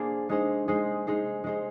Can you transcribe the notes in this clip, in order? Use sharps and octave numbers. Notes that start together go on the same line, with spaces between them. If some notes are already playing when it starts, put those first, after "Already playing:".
Already playing: A#3 D4 G#4 C5
G#3 D#4 G#4 C5
G#3 D#4 G#4 C5
G#3 D#4 G#4 C5
G#3 D#4 G#4 C5